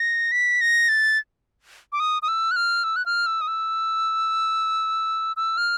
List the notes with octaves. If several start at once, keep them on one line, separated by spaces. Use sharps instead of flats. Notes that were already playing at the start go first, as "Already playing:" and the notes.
Already playing: A#6
B6
A#6
A6
D6
D#6
D#6
E6
F#6
F6
E6
F#6
F6
E6
D#6
E6
E6
F6